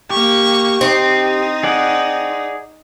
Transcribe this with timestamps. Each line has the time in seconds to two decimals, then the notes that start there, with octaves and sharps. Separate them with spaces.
0.10 A#3 G4 C#6
0.81 C4 D#4
1.63 G#4 D5 F#5